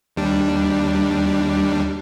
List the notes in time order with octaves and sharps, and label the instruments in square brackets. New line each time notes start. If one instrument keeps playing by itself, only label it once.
[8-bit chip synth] D#2 G3 D4